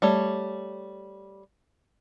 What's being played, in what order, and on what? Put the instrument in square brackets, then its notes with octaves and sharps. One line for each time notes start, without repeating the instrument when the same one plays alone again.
[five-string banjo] G3 A3 C#5